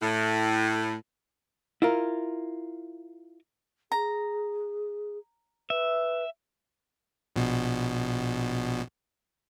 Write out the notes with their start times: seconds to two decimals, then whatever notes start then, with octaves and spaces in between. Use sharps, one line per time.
0.02 A2
1.82 E4 F4 A#4
3.92 G#4 A#5
5.70 B4 E5
7.36 A#1 B2